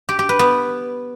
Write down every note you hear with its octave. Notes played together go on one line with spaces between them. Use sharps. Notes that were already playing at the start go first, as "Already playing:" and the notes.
G4
G4
B4
B3